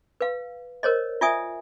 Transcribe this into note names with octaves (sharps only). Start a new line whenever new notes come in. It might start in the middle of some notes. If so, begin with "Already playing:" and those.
B4 F5
A#4 C5 C#5 D#5
F4 D5 E5 G#5 D#6